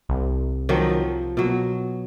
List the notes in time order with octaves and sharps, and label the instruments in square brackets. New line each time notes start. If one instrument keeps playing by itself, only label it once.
[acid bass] C2
[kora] D#3 F3 F#3
F3
B2 F#3